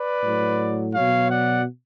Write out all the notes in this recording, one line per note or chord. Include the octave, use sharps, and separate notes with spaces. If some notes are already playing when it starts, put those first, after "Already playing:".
Already playing: B4 D5
A2 F#3
B2 F#3 C#5 F5
D5 F#5